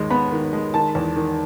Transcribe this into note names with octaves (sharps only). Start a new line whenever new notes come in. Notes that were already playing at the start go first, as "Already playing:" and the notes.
Already playing: D#2 D#3 G#3
B3 B5
D#3
G#3
D#3 A5
E2
D#3